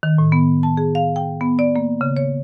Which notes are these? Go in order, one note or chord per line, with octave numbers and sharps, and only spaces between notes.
D#3
A2
B3
A5
G#4
F5
G5
B3
D5
A#3
C#3
C#5